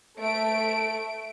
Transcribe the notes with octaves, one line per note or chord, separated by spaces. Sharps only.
A3 D7